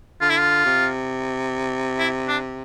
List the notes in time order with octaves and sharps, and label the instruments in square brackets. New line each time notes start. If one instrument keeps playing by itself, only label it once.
[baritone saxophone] D3 [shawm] F4
[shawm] E4
F4
[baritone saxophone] C3
[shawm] E4
D4